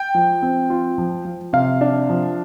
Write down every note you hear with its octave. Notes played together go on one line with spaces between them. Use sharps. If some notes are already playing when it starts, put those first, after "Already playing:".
Already playing: G5
F3
C4
F4
F3
F3
C3 F5
D4
F3